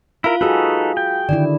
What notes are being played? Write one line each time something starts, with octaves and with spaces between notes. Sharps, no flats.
E4 F4 A#4 F5
D#4 F#4 G#4 A4 B4
G5
D3 D#3 E4 D5